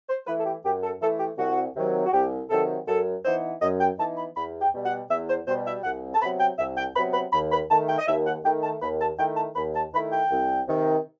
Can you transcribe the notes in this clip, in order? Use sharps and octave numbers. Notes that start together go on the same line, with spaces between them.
C5
E3 A3 E4 B4
A4
G4
F#2 G4
A4
E3 A3 E4 A4
G4
C2 F#4
C3 D#3 F#3
F#4
C2 G4
C3 D#3 F#3 A4
F#2 A4
E3 B3 D#4 C5
F#2 D#5
G5
E3 B3 D#4 A5
B5
E2 B5
G5
B2 G3
F#5
E2 E5
C5
B2 G3 C5
E5
C2 F#5
A5
C3 F#3 B3 B5
G5
C2 E5
G5
C3 F#3 B3 B5
B5
D#2 B5
B5
D#3 A3 A5
G5
D#5
D#2 E5
F#5
D#3 A3 G5
A5
D#2 B5
A5
D#3 A3 E4 G5
A5
D#2 B5
A5
D#3 A3 E4 B5
G5
C2
C3 D#3